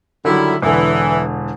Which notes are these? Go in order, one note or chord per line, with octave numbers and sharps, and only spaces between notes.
D3 D#3 F#3 G3 E4
E1 D3 E3